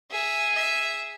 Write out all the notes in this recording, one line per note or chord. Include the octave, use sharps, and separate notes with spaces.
G#4 E5
E5